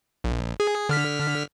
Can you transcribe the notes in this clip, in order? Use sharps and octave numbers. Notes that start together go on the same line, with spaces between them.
A#1
G#4
D3 F6 B6